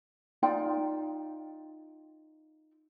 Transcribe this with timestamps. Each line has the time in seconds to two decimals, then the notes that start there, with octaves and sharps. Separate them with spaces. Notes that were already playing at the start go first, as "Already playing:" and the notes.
0.43 D#4 F4 D5 G5